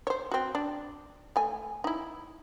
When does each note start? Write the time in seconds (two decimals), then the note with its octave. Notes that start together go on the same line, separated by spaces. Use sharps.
0.07 C5 C#5
0.31 C4 F#4
0.55 D4
1.36 A3 G#5
1.84 D#4 E4